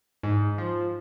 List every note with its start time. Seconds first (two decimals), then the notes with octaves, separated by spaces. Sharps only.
0.23 G#2
0.58 F3